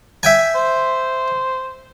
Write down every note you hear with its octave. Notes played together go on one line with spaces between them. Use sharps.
E5 G5 G#5
C5